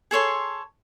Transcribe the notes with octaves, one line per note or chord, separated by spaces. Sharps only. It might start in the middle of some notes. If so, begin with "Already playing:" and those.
G#4 A4 C#5 C6